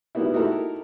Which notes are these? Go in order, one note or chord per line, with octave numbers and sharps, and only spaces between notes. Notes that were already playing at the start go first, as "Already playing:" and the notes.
B2 G3 A#3 B3 D#4 E4
D#4 E4 F#4 G4 A4 A#4